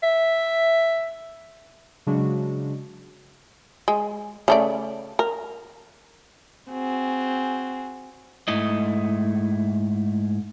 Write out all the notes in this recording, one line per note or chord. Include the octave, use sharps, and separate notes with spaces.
E5
C#3 F#3 G#3 D4 F#4
G#3
C#3 A3 D5
A#4
C4 F#4 G#4
G#2 A3 E4 D#5